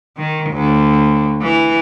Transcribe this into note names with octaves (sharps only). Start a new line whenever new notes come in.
D#3
D2
E3